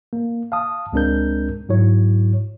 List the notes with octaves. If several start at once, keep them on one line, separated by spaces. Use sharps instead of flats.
A#3
F5 A5 D#6
C#2 G#3 C4 D4 A#4 G6
G#2 F#3 E4 C#5